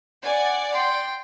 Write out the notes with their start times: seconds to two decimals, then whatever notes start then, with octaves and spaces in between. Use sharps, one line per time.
0.22 D5 F#5 G#5
0.73 G5 C6